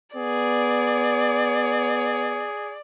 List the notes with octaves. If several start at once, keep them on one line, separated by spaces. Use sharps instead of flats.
B3 G#4 D5